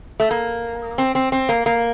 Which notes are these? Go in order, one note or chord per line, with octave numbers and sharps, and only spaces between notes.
A3
A#3
C4
C4
C4
A#3
A#3